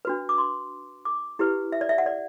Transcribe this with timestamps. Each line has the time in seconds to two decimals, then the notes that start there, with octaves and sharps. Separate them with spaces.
0.05 D4 F#4 B4
0.29 D6
0.38 C6
1.05 D6
1.39 E4 G4 B4
1.72 E5
1.81 D5
1.89 E5
1.98 F#5
2.06 D5